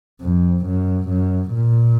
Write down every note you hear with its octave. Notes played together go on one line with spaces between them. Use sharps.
F2
F#2
F#2
A#2